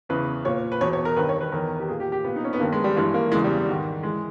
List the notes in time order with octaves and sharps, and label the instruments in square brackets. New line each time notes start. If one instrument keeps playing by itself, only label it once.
[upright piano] E2 C#3 E3 B4
A#2 C#5
B4
E2 B2 C#5
C#5
A#4
G2 D#3 B4
C#5
B4
E2 D#3 A#4
G4
A#2 G#4
G4
G4
A#2 B3
D#4
C#4
B3
G2 D#3 A#3
G#3
G3
G2 E3 G#3
A#3
E2 C#3 E3 G#3
G3
G#2 D#3
E3 G#3